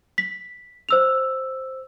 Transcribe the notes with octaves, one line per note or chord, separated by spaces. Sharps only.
B6
C5 E6 F7